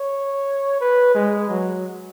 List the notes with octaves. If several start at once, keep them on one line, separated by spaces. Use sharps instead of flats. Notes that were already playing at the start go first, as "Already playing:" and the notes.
Already playing: C#5
B4
G#3
F#3